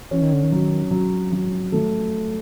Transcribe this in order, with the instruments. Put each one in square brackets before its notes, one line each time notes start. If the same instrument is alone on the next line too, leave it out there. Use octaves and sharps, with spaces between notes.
[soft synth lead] E3 [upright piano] C#4
[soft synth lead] D#3
D3
D#3
[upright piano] F#3
F#3
F#3
[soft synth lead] D#3 [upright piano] A3